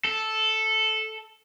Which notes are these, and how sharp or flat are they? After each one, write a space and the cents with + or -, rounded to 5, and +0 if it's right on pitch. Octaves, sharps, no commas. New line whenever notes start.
A4 -5